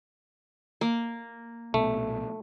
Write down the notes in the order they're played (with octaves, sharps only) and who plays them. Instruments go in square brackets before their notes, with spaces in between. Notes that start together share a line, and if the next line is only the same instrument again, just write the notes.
[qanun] A#3
[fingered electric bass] B1 A#2 B3 [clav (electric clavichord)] A3